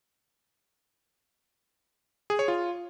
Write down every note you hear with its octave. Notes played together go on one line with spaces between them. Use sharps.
G#4
C#5
F4